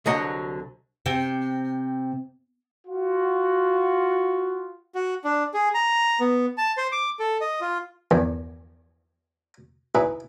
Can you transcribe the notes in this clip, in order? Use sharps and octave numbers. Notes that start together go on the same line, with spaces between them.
C2 D3 F#3 D#5 F#5
C3 C4 G5
F4 F#4
F#4
D4
G#4
A#5
B3
A5
C5
D6
A4
D#5
F4
E2 G2 D#3
D#4 E4 G#4 B4